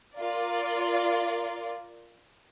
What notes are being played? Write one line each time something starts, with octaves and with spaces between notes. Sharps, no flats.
F4 A#4 D5